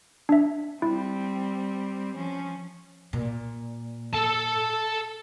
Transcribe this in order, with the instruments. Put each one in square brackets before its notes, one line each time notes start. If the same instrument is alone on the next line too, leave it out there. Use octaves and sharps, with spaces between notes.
[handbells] D4 E5
[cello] G3 C4 [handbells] E4
[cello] F3 C#4
[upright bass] A#2
[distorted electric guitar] A4 A5